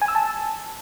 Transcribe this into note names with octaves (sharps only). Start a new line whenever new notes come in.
G#5
E6
A5